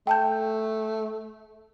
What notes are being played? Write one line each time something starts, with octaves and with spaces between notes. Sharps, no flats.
A3 G5 A5 G6